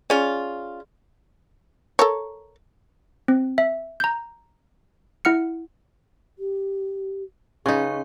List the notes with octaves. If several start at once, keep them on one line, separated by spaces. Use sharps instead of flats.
C#4 F4 G#4 D5
A4 A#4 C#5
C4
E5
A#5 G6
E4 F#5 F6 C#7
G4
C#3 C#4 D#4 G#4 C#6